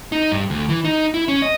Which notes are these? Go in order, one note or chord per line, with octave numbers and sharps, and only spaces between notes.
D#4
G2
D2
E3
D#4
E4
C#4
D#5